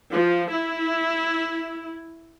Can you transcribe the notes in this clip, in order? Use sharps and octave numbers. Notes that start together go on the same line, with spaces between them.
F3
E4